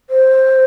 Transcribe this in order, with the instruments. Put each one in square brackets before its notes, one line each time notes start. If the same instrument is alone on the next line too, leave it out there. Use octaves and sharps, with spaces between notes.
[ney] C5